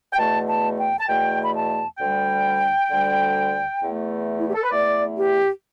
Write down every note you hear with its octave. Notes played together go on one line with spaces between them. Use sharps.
G5
E2 B2 A3 A5
A5
G5
A5
E2 B2 A3 G5
B5
A5
D2 D3 G3 G5
D2 D3 G3
E2 E3 A3
E4
G4
A4
B4
E2 E3 A3 D5
G4